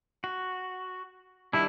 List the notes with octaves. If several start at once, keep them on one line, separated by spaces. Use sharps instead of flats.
F#4
D#3 G3 D4 E4